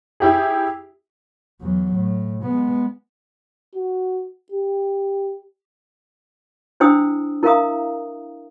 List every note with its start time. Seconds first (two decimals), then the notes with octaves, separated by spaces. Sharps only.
0.20 E4 G4 G#4
1.61 E2 F#3
1.94 A2
2.43 G#3 B3
3.75 F#4
4.52 G4
6.80 D4 E4 C5 G5 D#6 E6
7.43 E4 A#4 E5 F5 A#5 D#6